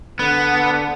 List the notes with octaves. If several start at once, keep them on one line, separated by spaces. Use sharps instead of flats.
D3 B3